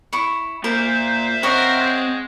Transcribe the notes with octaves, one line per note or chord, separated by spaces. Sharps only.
E4 C#6
A#2 A#4 C5 E5 F5
C4 A#4 C#5 D#5 F#5
G#3